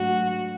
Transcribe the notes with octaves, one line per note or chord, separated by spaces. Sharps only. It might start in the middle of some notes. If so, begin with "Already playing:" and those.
Already playing: G#2 F#3 A3 D4 F#4